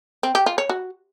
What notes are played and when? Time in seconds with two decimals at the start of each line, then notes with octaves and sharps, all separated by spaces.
0.23 C4
0.35 G4
0.46 F4
0.58 C#5
0.69 F#4